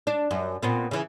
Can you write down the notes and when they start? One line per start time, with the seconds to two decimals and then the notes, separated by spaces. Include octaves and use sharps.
0.07 D4
0.31 F#2
0.62 A#2 B3 C4
0.91 C#3 E3